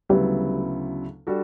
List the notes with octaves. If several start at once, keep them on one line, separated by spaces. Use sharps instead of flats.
D2 C#3 F#3 G3 B3 E4
G3 D4 F#4 A4